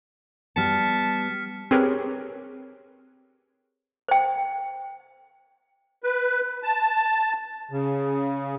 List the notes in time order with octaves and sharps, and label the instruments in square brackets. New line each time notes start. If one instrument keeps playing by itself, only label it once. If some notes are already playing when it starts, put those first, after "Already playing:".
[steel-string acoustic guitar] G3 B3 [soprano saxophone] A5 [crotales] F6 B6 C#7
[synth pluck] C4 G4 G#4 A#4 B4 C#5
[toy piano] C5 G5
[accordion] B4
A5
C#3